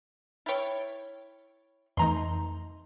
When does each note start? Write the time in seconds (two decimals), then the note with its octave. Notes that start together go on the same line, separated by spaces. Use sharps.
0.46 E4 C#5 G5 F6 A6
1.97 F2 E3 A3 D#4 A#5 C6